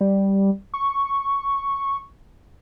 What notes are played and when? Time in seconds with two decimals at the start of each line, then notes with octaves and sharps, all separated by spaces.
0.01 G3
0.74 C#6